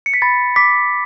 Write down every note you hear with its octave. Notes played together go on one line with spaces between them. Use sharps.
C#7
B6
B5 A6
D6 B6